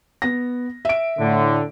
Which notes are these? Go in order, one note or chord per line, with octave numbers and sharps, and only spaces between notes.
B3 A#6
E5 D7
A2 D3